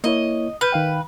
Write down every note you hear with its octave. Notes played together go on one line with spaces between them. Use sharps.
A#3 E4 C#5 D#5
B4 B5 F6 G6
D#3 F5 G5